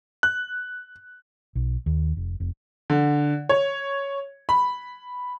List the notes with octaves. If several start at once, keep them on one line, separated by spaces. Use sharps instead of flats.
F#6
B1
D#2
F1
F1
D3
C#5
B5